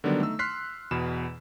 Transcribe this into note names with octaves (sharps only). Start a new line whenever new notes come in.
D3 D#3 F#3 G3 B3 D4
A3 D#4 E6
C6 F6 F#6 B6 C7
E2 B2 B5 E7